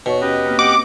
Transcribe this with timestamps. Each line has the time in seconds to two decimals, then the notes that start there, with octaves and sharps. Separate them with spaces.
0.06 D#2 B2 C#5 C#6
0.21 C#4 G4 B4 D#5
0.46 A#3 C4 F6
0.59 G4 D#5 F#5 D6